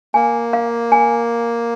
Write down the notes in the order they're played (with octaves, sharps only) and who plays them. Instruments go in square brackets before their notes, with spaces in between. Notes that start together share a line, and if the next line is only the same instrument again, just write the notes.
[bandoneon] A#3 [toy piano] G#5
[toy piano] F5
G#5